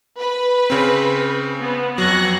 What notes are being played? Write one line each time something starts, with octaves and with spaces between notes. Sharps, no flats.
B4
C#3 C4
B3
F2 F#3 C#6 F#6 A#6